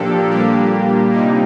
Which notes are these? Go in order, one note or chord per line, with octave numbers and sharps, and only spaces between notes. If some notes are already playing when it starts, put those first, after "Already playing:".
Already playing: A#2 F3 A#3 D4 G4 A4
A#2 G3 A#3 D4 G4
C3 G3 A#3 D#4